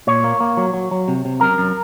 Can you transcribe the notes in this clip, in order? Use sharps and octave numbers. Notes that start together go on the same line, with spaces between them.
A#2 C#5
A#3
A#3
F#3
F#3
F#3
C3
C3
F#2 A#4
F#2